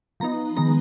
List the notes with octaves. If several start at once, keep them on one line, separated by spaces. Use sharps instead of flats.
F3 B3 D#4 A#5
D#3 G#3 B3 D#4 A#5